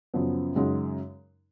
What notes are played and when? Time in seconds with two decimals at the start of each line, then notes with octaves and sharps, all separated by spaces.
0.14 F#2 C#3 F3 B3
0.55 F#2 C#3 G#3 D#4 F#4